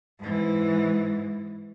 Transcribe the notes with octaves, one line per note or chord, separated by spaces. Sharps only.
G#2 E3